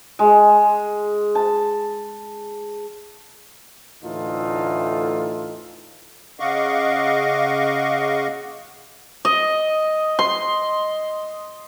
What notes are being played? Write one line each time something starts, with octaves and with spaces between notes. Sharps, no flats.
G#3
A5
D2 A2 E3 D#4 F4 A4
C#3 D#5 F5 F#5 C#6 D6
D#5
C6